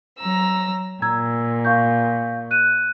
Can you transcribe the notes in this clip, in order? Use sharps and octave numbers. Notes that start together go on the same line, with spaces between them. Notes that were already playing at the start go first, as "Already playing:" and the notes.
F#3 A#5 E6
A#2 A#5 E6 G#6
F5 C#6 G6
F#6 D#7